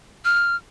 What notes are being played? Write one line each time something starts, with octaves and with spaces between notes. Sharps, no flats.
F6